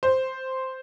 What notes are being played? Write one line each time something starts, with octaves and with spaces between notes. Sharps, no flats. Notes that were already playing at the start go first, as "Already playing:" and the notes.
C5